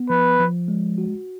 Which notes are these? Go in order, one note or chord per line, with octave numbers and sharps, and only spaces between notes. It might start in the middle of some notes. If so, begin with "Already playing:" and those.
Already playing: B3
F3 B4
F3
G#3
F#4